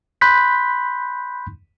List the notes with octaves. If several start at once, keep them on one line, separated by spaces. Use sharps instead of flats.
B5 C6 F#6 G6 B6